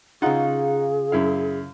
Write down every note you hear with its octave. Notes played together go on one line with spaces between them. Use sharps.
C#3 D#4 F4 G#4 F#5
F#2 E4 F5